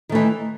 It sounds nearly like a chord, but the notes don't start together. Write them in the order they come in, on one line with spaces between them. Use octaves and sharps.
D#3 A3 E3